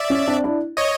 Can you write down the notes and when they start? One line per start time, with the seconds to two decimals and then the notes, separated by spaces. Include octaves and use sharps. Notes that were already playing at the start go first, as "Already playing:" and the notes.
Already playing: D5 E5
0.10 C#4
0.28 C4 D4
0.44 D4 E4
0.77 C#5 D#5